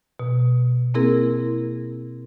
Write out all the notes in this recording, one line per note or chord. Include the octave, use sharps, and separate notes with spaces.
B2
A#3 C4 E4 G#4 A#4